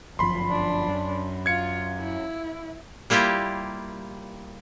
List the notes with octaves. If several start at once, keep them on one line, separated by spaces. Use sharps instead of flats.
G1 F#2 F3 B5 C6
D4
F#2
F4 G#6 C#7
E4
G3 A#3 E4 F4 G4